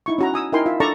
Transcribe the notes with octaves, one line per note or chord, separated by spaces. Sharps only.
D#4 E4 C#6
C#4 F#4 A#5
G#5 D#6 E6
D#4 E4 A#4 G5 G#5 C6
F4 E5
D4 A4 D5 A5 A#5 C#6